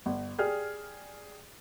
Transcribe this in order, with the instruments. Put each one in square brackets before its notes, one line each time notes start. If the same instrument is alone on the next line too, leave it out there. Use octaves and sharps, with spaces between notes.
[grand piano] G1
G4 G#4 D5 F6